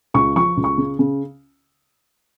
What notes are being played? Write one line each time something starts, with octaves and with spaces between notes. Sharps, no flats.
C#2 C#6
F3 C#6
C#2
C#6
C#3
C#3